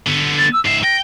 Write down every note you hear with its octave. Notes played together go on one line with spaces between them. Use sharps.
D3 B3
A6
E6
G#2 E5 C7
G5 A#6